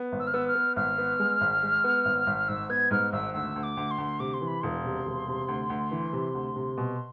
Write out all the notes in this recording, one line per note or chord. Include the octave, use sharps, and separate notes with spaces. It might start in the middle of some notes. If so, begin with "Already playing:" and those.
Already playing: B3
G#1
E6
F6
B3 E6
F6
B3
G#1 F6
B3
G#3
G#1
G#3
B3
G#1
G#1
G#2 E6
B3 G#6
G#2 F6
G#1 E6
D2 E6
D2
D6
D2
C6
D2
C3 D6
C6
E3
B5
E1 C6
C3
E1
C3
D2
D2
E3
C3
D2
C3
B2